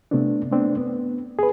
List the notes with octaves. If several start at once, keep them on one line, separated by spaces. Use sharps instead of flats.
C3 A3 B3 C4 D4
A3 B3 C4 D4
B3
G#4 B4